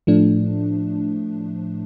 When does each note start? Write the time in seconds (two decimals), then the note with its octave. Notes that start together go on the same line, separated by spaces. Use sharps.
0.07 A2 F3 A3 D4